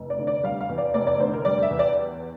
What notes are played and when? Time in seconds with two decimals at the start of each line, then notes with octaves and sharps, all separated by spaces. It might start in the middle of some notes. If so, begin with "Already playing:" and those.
Already playing: F1
0.10 D5
0.19 D3
0.27 D5
0.44 G3 F5
0.61 F5
0.69 E2
0.78 D5
0.94 F1 D5
1.07 D5
1.20 D3 C5
1.33 A#4
1.45 G3 D5
1.62 E5
1.70 E2
1.79 D5